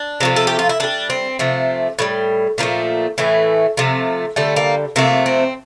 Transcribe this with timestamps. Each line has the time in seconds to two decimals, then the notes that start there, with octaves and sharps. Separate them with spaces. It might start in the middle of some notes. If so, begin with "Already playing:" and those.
Already playing: D4
0.20 C3 F3 A3
0.36 A4
0.47 G4
0.59 F4
0.69 E4
0.80 D3 G3 D4
1.10 C4
1.39 C3 F3 A3
1.99 A2 E3 G3
2.58 A#2 F3 A3 A#3
3.18 A2 E3 A3
3.77 C3 F3 A3
4.36 D3 G3 A3
4.56 A#3
4.96 C3 F3 A3 A#3
5.26 C4